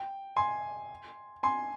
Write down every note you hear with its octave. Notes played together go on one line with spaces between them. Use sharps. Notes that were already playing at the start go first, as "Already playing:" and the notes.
Already playing: G5
G#5 C6
G#5 C6